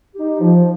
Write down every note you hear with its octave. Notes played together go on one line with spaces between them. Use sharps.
D#4 G4
F3